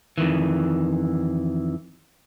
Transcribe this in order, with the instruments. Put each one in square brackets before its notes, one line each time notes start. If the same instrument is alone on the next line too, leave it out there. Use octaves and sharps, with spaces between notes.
[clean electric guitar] F2 G#2 D#3 E3